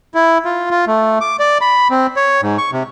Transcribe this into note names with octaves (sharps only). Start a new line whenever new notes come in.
E4
F4
F4
A3
D6
D5
B5
C4
C#5
G#2
C#6
C3